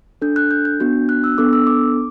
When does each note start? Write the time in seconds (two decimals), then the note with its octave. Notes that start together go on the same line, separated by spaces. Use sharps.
0.22 D4 A4 G6
0.36 F#6
0.51 G6
0.65 G6
0.80 B3 D4 F#4
1.09 F#6
1.24 E6
1.38 B3 D4 A4 D6
1.53 E6
1.67 D6